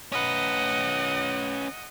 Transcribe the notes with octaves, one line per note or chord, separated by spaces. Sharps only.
C#4 B4 D#5 F#5